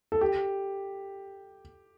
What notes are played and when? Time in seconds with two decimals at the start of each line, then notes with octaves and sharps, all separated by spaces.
0.12 A4
0.21 G4